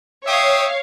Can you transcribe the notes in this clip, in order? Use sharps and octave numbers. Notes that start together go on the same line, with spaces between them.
C#5 E5 F5 G5 D#6